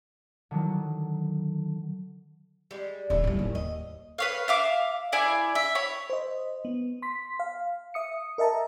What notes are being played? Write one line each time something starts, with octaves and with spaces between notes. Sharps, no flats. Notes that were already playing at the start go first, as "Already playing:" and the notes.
D3 D#3 F#3
G3 G#3
D#1 D3 C#4 E4 F4
A2 G3
D#2
D#5
B4 C#5 F5
E5 F5 D6
E4 G#4 D5 G#5
E5
C#5 B5
C5 D#5
B3
C6 B6
F5
E5 D#6 C#7
A#4 D#5 E5 A5 A#5